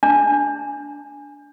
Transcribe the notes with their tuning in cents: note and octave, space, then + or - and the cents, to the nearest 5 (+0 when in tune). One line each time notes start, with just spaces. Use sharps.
D4 -15